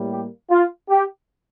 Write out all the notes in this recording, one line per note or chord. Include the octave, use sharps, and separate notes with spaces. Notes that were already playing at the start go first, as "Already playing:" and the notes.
Already playing: A2 G3 A#3
G4
F4
G4